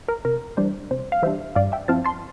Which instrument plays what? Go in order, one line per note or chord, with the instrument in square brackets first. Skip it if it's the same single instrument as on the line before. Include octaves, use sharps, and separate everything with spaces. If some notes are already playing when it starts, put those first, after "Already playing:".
[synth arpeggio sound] A#4
C3 A#4
E3 G3 D4 C5
C3 C5
F5
E3 G3 D4 C5 E5
G2 D5 F5
E5 G5
F3 C4 E4 F5 A5
A5 C6